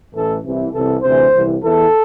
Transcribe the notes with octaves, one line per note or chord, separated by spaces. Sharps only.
A1 A2 E3 A4
C2 C3 E3
C2 C3 E3 A4
D2 C3 E3 C5
C2 C3 E3
E2 E3 A4